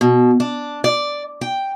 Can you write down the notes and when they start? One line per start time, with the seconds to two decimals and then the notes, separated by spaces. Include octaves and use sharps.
0.01 B2
0.40 D4
0.84 D5
1.41 G5